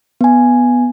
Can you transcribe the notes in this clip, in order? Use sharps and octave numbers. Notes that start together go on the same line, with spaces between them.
B3 G#5